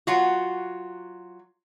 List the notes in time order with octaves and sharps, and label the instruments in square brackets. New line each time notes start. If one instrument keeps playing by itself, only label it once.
[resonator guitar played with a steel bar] F#3 F4 F#4